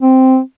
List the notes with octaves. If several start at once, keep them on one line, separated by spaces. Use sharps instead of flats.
C4